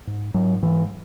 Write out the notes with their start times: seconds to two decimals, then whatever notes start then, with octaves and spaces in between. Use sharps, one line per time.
0.07 G#2
0.34 G#2 F#3
0.62 G#2 E3